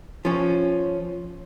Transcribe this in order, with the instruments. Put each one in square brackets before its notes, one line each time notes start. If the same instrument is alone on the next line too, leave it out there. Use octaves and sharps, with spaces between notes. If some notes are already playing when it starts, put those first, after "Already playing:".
[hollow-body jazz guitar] F3 C#4